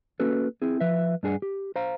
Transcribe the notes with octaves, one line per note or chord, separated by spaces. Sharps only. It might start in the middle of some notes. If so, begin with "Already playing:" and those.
A#3 C#4 F#4 A4 B4
C4 E4 G#4
F3 B4 E5
G2 D4 G#4 A#4 F#5
G4
C5 F5 A#5